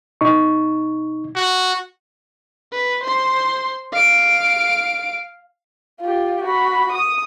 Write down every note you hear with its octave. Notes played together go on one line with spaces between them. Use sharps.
B2 D#4 C#6
F#4
B4
C5 C6
F5 D7
F4 G4
F#4 B5
D#6